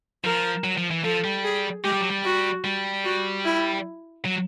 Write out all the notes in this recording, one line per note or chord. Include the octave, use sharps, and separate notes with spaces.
F3 A#4
F#3
F3
E3
F3 A4
G3
G#4
G#3 G4
G3
F#3
G3
F#4
G3
F#4
E4
F#3